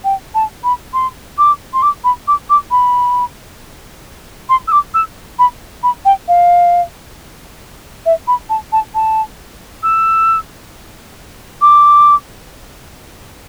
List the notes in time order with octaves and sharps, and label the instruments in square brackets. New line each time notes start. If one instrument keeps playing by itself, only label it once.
[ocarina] G5
A5
B5
C6
D6
C6
D6
B5
D6
D6
B5
C6
E6
D6
E6
B5
B5
G5
F5
E5
B5
A5
A5
A5
E6
D6